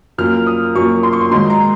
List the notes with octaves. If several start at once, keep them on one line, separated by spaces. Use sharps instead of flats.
F#2 F3 A#3 F6
D#6
F#2 F3 A#3 C#6
C6
C#6
C6
G#2 D#3 F#3 C6
A#5